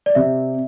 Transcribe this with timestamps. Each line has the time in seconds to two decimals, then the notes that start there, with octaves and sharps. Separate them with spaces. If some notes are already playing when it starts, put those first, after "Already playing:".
0.06 D5
0.15 C3 E5